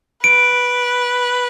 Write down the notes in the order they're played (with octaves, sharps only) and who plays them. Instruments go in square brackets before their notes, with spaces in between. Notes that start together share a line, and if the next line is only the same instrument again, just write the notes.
[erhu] B4 [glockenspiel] D7